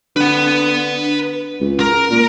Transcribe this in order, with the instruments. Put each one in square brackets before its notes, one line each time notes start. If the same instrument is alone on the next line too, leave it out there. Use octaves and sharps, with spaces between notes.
[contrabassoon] D3 [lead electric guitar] B4 F#5
[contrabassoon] C#2
[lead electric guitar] A#4
[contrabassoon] A#2